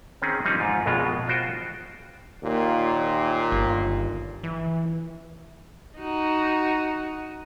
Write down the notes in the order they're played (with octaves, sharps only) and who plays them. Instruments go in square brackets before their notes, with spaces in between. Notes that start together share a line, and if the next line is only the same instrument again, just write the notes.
[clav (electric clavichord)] D#3 C4 C#4 G#4
F3 G3 C4 C#4 D#4
G#2 F4
A#1 F2 B2 G#3 F4
B2
F4 F#4 C5 G5
[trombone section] D#2 A#2
[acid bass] G1
E3
[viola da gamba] D#4 F#4